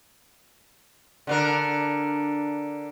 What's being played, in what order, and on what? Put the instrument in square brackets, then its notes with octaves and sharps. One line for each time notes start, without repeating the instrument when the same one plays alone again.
[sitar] D3 D4 A#4